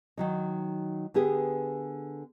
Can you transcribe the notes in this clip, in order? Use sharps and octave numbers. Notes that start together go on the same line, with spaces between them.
D#3 F#3 D#4
D3 B3 G4 G#4